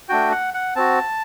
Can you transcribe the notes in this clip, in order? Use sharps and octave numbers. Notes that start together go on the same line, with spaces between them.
A3 D4 F#4 G5
F#5
F#5
C4 F#4 A5